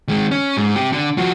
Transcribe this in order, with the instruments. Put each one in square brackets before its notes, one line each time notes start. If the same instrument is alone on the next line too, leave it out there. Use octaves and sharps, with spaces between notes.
[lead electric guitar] D#3 G#3
C#4
G#2
C3 G4
D3
F3 F#4